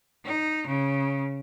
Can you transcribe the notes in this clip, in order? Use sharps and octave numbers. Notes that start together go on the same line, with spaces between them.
D#4
C#3